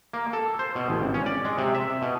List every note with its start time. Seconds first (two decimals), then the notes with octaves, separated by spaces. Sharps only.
0.13 A#3
0.33 A4
0.59 C5
0.75 B2
0.88 A1
1.01 G#1
1.14 C#4
1.26 D5
1.45 G#3
1.58 C3
1.75 E5
2.02 B2